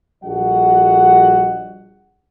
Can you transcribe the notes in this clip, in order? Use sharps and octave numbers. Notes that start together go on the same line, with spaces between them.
A#1 G3 F#4 A4 D#5 F#5